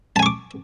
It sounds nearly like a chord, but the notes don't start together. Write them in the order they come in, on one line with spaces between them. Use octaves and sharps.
A5 G#5 C#6 D6